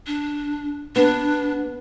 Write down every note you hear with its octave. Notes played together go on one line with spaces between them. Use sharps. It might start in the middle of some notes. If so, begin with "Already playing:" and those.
D4
B3 D4